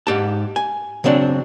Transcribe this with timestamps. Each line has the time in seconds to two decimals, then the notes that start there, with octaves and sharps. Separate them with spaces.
0.07 G#2 G4 A5
0.56 G#5
1.04 C#3 F#3 C4 D4